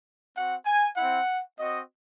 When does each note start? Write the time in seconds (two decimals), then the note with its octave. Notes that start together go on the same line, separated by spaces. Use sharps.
0.35 C4 F#4 F#5
0.66 G#5
0.97 C4 E4 F#5
1.59 C4 F#4 D#5